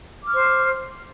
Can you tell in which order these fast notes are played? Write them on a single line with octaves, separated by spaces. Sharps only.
D6 F6 C#6 C5